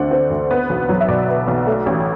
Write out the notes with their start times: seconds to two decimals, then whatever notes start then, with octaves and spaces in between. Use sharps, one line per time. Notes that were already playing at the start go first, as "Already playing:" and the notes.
Already playing: D2 D3 A3 C4 C5 D5 F#5
0.11 C4
0.30 D2
0.50 B3
0.69 B1
0.89 F#3
1.00 E5
1.08 B2 D5
1.28 B3
1.47 B1
1.67 A3
1.86 A1